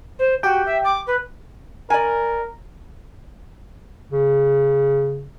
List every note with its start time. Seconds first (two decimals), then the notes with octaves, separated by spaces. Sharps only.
0.19 C5
0.43 F#4 G4 G5
0.66 E5
0.84 D6
1.07 B4
1.90 A#4 D5 G#5
4.11 C#3